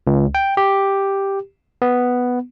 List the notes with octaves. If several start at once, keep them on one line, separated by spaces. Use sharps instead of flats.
C#2
G5
G4
B3